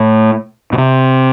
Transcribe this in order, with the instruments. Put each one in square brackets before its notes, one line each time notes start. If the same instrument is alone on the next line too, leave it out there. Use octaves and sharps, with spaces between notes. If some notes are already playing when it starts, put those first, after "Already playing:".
Already playing: [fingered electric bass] A2
B2
C3